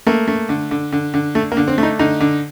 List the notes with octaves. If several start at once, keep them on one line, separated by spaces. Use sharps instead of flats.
A3 A#3
A3
D3
D3
D3
D3
A3
A#3
D3
C4
A3
D#4
D3 D#4
D3